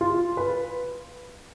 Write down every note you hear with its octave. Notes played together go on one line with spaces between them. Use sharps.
F4
B4